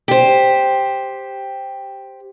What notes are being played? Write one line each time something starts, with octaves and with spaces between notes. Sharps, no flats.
G4 C5